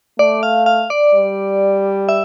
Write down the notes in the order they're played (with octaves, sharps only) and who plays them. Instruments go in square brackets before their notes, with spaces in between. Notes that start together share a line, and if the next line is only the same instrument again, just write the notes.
[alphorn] A3 [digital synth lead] D5
[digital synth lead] F5
F5
D5
[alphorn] G3
[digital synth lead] E5